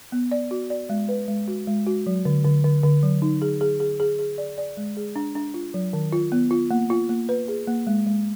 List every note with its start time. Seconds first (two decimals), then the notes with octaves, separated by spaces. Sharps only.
0.12 B3
0.32 D5
0.51 F#4
0.70 D5
0.90 G#3
1.09 B4
1.28 G#3
1.48 F#4
1.67 G#3
1.87 F#4
2.06 F#3
2.25 D3
2.45 D3
2.64 D3
2.83 D3
3.03 F#3
3.22 D#4
3.42 G#4
3.61 G#4
3.80 G#4
4.00 G#4
4.19 G#4
4.38 D5
4.58 D5
4.77 G#3
4.97 G#4
5.16 D4
5.35 D4
5.54 F4
5.74 F#3
5.93 D#3
6.12 F4
6.32 B3
6.51 F4
6.71 A#3
6.90 F4
7.09 A#3
7.29 B4
7.48 G#4
7.67 A#3
7.87 G#3
8.06 G#3